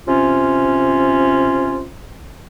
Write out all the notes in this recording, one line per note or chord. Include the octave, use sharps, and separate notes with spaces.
C3 C#4 F4